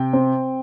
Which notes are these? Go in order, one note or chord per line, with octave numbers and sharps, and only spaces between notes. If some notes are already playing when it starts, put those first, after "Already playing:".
Already playing: C3 G5
C4